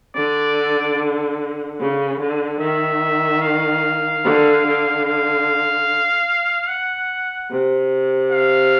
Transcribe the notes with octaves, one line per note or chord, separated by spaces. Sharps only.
D3 D5
C#3
D3
D#3 E5
F5
D3
D3
F5
F#5
C3
F5